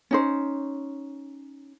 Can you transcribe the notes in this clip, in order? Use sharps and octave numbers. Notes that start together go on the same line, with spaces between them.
C#4 D#4 C5